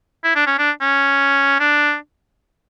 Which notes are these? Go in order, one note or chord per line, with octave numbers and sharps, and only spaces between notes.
E4
D4
C#4
D4
C#4
D4